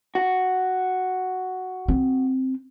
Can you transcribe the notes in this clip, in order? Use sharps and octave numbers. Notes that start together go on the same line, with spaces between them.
F#4
C4